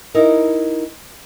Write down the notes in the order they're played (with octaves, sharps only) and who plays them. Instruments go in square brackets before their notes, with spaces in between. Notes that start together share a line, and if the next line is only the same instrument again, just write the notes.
[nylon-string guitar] D#4 E4 A#4